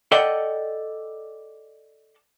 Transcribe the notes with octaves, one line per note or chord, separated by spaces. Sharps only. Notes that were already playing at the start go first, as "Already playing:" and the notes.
A4 D5 D#5 F#5 G5